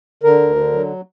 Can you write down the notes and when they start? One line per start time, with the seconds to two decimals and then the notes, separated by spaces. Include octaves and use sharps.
0.23 D3 A#4
0.40 D2
0.56 D3
0.72 F#3